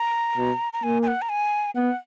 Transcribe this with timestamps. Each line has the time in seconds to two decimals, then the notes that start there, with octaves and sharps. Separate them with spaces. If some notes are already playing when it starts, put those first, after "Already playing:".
Already playing: A#5
0.37 B2
0.73 A#5
0.83 A#3 G#5
1.02 G#5
1.07 F#5
1.22 A#5
1.29 G#5
1.75 B3 F#5